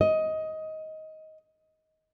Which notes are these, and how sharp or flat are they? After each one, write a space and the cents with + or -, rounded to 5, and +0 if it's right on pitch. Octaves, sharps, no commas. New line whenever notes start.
D#5 +15